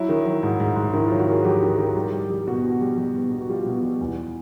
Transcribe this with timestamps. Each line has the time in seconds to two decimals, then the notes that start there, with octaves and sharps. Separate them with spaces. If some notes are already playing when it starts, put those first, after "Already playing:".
Already playing: F#3 E4
0.09 D#3
0.25 F#3
0.43 G#2
0.60 G#2
0.76 G#2
0.93 D#3 E4
1.07 F#3 F4
1.19 F#4
1.28 D#3 G#4
1.44 F#3 G4
1.62 D#3
1.78 D#3
1.96 G3
2.13 G3
2.30 G3
2.47 B2 F#4
2.64 B2
2.81 G3
2.98 G3
3.16 B2
3.32 B2
3.41 F#4
3.49 G3 F4
3.66 B2
3.83 G3
4.01 E2